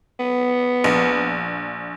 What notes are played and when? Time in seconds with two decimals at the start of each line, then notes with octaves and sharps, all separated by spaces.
0.20 B3
0.84 A#1